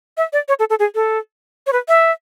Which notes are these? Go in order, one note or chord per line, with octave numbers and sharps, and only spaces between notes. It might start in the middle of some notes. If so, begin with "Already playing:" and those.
E5
D5
C#5
A4
A4
G#4
A4
C#5
B4
E5